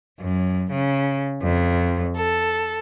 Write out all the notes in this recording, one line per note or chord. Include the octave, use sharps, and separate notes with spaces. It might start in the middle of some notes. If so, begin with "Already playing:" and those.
F#2
C#3
F2
A4